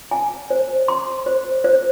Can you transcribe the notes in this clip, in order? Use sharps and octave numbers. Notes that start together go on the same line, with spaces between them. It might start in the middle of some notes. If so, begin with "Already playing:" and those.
G#5
C5
C6
C5
C5